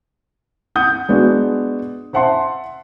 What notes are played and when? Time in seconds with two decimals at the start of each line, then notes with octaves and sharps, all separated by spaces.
0.76 F#5 D#6 G6
1.09 G#3 B3 D4 F#4
2.13 C5 E5 F#5 A5 C6